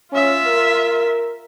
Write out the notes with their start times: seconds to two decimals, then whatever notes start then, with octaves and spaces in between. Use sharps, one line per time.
0.12 C#4 F4 E5
0.47 A#4